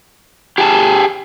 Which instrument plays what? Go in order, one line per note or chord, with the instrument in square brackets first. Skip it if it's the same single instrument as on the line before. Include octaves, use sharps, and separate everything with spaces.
[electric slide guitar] G4 G#4 G5 A5